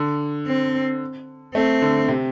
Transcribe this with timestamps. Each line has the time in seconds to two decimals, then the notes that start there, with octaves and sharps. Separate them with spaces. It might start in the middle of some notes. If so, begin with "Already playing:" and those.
Already playing: D3
0.47 C4
1.54 A3 C4
1.82 D3
2.09 C3